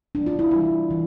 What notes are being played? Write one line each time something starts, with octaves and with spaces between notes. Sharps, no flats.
C3 E3 G3 D4
F4
E4
C3 E3 G3 E4
C3 E3